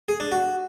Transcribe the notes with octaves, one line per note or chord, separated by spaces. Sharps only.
G#4
D4
F#4